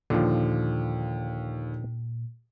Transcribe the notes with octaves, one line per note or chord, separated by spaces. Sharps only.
D#2 A#2 D3 F3